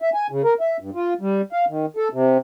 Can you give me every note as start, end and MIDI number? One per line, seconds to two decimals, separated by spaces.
0.02 0.10 76
0.14 0.27 80
0.31 0.42 49
0.44 0.54 70
0.60 0.77 76
0.80 0.90 43
0.95 1.14 65
1.21 1.41 55
1.52 1.65 77
1.69 1.86 51
1.97 2.08 69
2.13 2.38 48